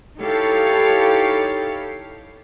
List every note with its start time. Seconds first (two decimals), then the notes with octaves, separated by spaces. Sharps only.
0.20 D#4 E4 G4 A4 C#5 F5